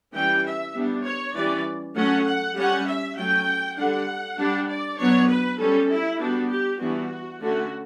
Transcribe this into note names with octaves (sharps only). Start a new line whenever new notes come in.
E3 G3 C#4 G5
E5
G3 B3 D4
C#5
E3 G3 C#4 D5
F#3 A3 C#4 F#5
F#5
G3 C#4 F#5
E5
F#3 A3 C#4 G5
D3 G3 D4 F#5
G3 D4
D5
F#3 B3 D4 C#5
B4
G3 C#4 A4
E4
G3 B3 D4 F#4
G4
E3 G3 B3 D4 F#4
D3 A3 C#4 F#4